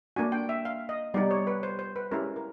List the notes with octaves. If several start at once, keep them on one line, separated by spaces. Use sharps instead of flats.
A#3 D4 F#4 G#5
G5
E5
F5
D#5
G3 B3 D#4 G4 D5
C#5
B4
C5
C5
B4
G#3 C#4 E4 G4 A#4
A#4